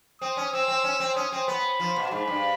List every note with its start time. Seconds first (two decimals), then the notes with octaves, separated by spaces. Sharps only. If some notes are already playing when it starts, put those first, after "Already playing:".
0.21 C4 D#6
0.37 C#4
0.53 C4 E6
0.68 C4
0.84 C#4
1.00 C4
1.16 C#4 D#6
1.32 C4
1.48 B3 B5
1.80 F3
1.96 B2
2.11 G#2 B5
2.28 G2